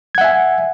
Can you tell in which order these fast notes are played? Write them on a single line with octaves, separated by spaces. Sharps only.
G#6 F#5 E5 G#5